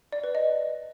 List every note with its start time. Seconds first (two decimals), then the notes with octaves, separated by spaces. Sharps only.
0.12 D5
0.24 B4
0.35 D#5